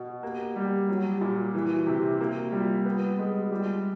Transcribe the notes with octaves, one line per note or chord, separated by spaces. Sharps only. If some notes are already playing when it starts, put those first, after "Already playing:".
Already playing: B2
A#3 G4
G3
F#3
A#2
E3 F#4
C3 G4
A#3 F#4
G3 F4
B3 F4
G#3 A4
G#4
G4
F#4
G3 F4